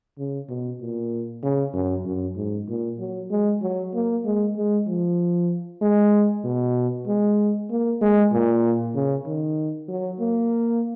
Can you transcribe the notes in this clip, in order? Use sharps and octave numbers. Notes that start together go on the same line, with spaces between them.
C#3
B2
A#2
C#3
F#2
F#2
G#2
A#2
F#3
G#3
F#3
A#3
G#3
G#3
F3
G#3
B2
G#3
A#3
G#3
A#2
C#3
D#3
F#3
A#3